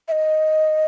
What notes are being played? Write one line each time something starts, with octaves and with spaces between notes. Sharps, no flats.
E5
D#5